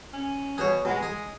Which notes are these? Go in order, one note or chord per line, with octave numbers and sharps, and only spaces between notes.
C#4
B2 G#4 C#5
B2 G#3
G#4